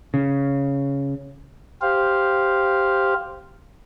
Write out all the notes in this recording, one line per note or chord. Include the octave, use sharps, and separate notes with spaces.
C#3
G4 C5 F5